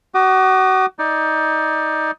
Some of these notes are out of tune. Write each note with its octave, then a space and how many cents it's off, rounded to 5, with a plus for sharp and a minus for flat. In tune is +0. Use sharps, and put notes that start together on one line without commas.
F#4 +30 D#6 -40
D#4 +20 D5 +15